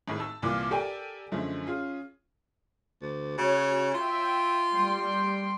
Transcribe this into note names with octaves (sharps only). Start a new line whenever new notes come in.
G#1 A2 D#3 G#4
A5 E6
C2 A#2 E3 F4 D6
G4 A4 A#4 D5 G5 G#5
F#2 D3 F3 G#3 A3
C#4 F4 G#4
D2
C#3 F#4 C#5
F4 E5 G5
G3 G5 C6